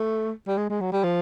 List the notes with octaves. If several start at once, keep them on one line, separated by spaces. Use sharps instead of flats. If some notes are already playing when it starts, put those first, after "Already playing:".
Already playing: A3
G3
G#3
G#3
F#3
G3
F3